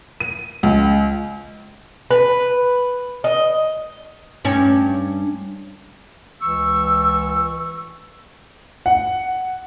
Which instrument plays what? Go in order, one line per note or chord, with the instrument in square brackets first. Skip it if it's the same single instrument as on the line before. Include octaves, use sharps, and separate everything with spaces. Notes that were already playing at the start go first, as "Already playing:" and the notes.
[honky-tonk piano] D#7
C#2
[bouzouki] B4
D#5
[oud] G2 C#4
[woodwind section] C#2 E3 C#6 E6
[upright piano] F#5